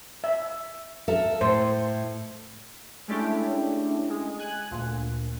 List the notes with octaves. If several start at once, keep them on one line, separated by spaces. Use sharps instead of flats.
E5
A4 A#4 E5
A2 C5
G#3 A3 C#4 D4 E4 G4
G#3
G#5 F#6
D2 A#2